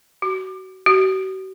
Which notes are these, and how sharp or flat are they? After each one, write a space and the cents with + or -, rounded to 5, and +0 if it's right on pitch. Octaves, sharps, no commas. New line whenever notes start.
F#4 +30
F#4 +45